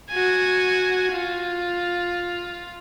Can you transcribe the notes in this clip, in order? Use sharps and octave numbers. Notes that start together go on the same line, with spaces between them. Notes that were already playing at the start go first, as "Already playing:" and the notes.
F#4 G#5
F4